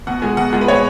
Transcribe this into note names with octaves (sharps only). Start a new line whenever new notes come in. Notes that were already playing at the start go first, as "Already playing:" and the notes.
B2 F#5
G#3 G#5
B2 F#5
G#3 F#5
B4
B2 C#5